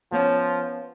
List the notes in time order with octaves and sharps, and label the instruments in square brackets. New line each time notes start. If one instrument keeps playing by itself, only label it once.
[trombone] F3 [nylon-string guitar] B3 C#4